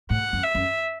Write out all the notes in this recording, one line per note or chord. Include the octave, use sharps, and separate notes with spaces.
A2 F#5
F#2
E5
F#2